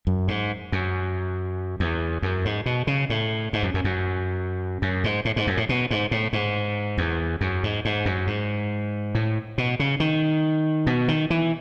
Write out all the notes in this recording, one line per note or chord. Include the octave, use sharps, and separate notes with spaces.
F#2
G#2
F#2
E2
F#2
G#2
B2
C#3
A2
G#2
F#2
F#2
F#2
F#2
G#2
A2
G#2
F#2
A2
B2
G#2
A2
G#2
E2
F#2
G#2
G#2
F#2
G#2
A2
B2
C#3
D#3
B2
D#3
E3